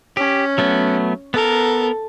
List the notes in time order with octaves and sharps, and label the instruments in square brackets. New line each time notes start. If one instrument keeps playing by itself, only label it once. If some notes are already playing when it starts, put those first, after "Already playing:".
[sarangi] C#4 [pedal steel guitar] G4
[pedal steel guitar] F#3 A3 B3
[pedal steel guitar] B3 A#4 [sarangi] A4